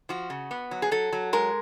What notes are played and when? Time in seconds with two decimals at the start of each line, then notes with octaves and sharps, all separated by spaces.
0.09 F3 F#4
0.30 C#3
0.51 B3
0.71 F#3
0.82 G#4
0.91 F#3 A4
1.13 F#3
1.33 G#3 A#4